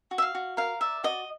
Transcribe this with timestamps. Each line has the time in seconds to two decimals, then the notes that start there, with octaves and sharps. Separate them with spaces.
0.11 F#4
0.18 E5
0.22 F5
0.35 F#4
0.57 A#4 F5
0.81 D5 E5
1.04 F#4 D#5